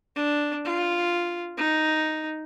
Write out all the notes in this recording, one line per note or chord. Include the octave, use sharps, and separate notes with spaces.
D4
F4
D#4